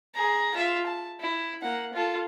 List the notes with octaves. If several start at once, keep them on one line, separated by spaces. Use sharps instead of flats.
G#4 A#5
F4 E5
A5
E4
A#3 F#5
F4 A4